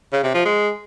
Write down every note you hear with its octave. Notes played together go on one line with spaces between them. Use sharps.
C#3
C3
F3
G#3